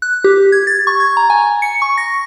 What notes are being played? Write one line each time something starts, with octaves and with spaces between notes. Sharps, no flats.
F#6
G4
G#6
A6
C#6
G#6
A#5
G#5
C#7
C#6
A#6